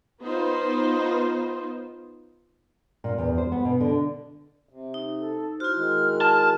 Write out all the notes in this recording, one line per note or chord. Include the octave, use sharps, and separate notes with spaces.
B3 D#4 F4 C5
A#2
E2
C5
B3
B2
D3
C3
D#4
A4
E4 F#4 C5 F6
D#3 G#3
A5